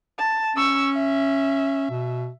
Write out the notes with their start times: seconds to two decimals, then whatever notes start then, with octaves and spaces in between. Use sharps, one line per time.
0.18 A5
0.56 C#4 C#6 E6
0.94 E5
1.90 B2